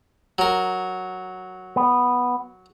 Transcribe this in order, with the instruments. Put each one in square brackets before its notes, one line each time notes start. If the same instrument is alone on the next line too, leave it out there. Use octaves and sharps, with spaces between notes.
[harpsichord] F#3 A#4
[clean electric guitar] B3